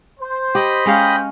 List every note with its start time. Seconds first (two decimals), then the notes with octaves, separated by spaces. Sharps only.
0.20 C5
0.55 G4 D#5 B5
0.86 G#3 C#4 C5 F5 G5